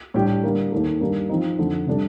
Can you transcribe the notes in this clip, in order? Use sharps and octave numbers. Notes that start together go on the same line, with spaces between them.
A2 G3 D4 G4
D3 G3 A#3
D#2 D#3 A3
G2 D#3 A#3 D4 G4
F3 C4 D#4
F2 D3 A3
C3 G3 D4 A4